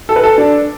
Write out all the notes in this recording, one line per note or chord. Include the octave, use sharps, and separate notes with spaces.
A4
B4
A4
D4